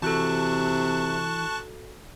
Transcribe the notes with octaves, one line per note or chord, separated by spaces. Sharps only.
C3 E3 F#4 A4 A5 C#6 F#6